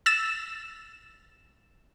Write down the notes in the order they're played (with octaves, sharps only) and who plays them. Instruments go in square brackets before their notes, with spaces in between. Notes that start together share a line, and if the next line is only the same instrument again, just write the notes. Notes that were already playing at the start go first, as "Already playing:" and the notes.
[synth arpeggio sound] E6 A6 E7